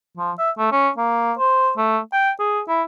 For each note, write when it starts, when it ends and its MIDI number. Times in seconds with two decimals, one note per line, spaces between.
0.17 0.32 53
0.39 0.50 76
0.58 0.70 57
0.72 0.89 61
0.97 1.33 58
1.38 1.71 72
1.77 1.99 57
2.13 2.31 79
2.39 2.60 68
2.68 2.82 64